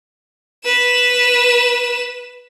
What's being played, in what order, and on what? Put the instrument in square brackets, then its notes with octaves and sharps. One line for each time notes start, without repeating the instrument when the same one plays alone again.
[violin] B4 E7